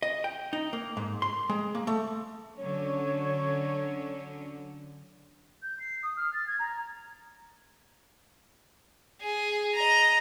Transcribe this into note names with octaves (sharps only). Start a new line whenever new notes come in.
D#5
G5
D#4
A#3
G#2
C6
G#3
A#3
A3
D3 F#3 C#4 C#5
G6
C7
D#6
F6
A6
G#6
A#5
G#4
D#5 A#5